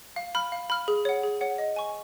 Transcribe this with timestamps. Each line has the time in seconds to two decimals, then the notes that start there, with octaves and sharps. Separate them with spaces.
0.16 F5
0.35 B5 F6
0.52 F5
0.70 B5 F6
0.88 G#4
1.05 C#5 F#5
1.23 G#4
1.41 C#5 F#5
1.58 D#5
1.76 G#5 C#6